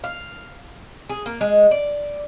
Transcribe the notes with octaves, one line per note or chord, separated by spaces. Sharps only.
F5
G#4
A#3
G#3
D5